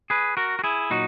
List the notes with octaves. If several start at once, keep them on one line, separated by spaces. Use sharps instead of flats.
G#4 B4
F#4 A#4
F#4
E4 G#4
A#2 F#3 D#4 F#4